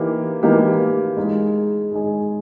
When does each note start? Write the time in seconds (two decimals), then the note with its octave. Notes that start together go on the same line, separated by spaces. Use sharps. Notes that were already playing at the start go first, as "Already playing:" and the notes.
Already playing: E3 A#3 D#4 G4
0.43 E3 A#3 D#4 G4
1.17 G#3 D#4 G#4
1.92 G#3 D#4 G#4